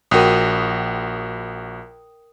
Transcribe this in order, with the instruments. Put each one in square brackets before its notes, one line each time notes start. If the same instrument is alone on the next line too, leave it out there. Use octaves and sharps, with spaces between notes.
[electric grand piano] A#1 F#4 [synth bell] A#4 G5 D#6